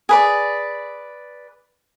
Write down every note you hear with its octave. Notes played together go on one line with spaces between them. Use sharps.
G#4 B4 D5